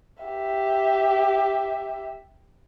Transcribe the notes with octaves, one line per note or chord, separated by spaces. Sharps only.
G4 E5